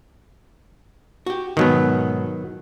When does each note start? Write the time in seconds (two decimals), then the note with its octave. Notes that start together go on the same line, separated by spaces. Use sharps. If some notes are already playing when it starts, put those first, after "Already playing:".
1.26 F#4 G4
1.57 G#2 B2 D#3 F#3 B3